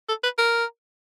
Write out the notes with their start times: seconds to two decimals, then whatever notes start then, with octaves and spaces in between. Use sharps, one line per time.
0.09 A4
0.24 B4
0.38 A#4